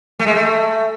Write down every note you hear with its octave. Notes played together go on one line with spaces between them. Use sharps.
A3
G#3
A3